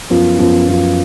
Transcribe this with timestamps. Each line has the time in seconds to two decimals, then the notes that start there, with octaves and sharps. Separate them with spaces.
0.10 F#2 F3 B3 F4
0.39 F#2 F3 B3 F4
0.67 F#2 F3 B3 F4